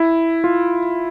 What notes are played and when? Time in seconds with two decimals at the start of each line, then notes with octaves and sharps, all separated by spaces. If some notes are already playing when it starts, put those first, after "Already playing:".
Already playing: E4
0.44 F4